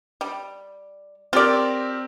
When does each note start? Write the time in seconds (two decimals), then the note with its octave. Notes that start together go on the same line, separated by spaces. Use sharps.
0.21 G3
1.33 C4 F4 G4 A#4 D5